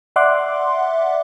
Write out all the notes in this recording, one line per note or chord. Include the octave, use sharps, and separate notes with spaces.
D5 E5 F#5 C6 D6 F#6